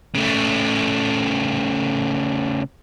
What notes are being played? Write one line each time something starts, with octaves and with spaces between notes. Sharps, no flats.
C#3 A3